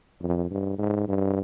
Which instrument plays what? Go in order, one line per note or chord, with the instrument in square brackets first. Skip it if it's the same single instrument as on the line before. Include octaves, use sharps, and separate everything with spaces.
[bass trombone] F2
G2
G#2
G2